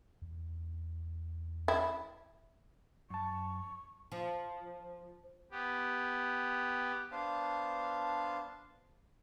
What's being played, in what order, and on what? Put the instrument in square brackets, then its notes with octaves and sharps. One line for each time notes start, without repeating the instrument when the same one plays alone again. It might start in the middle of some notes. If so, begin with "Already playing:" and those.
[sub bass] E2
[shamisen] E4
[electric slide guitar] F#2 A5 [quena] C#6
[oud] F3
[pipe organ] B3 G4
[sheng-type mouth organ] B3 D4 C5 F5 A5